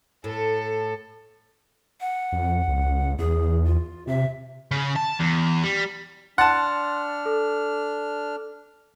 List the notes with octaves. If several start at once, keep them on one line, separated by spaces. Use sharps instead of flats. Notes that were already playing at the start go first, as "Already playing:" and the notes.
A2 A4
F#5
F2
C#2
E2 G#4
F4
C3 E5
C#3
A5
E2
G3
D4 F#5 A5 C6 F6 A6
A4